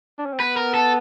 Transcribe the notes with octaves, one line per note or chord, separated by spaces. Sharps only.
D4
C#4
C4
B3 B4
A#4
A4